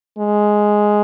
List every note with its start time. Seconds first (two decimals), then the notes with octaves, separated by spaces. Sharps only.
0.18 G#3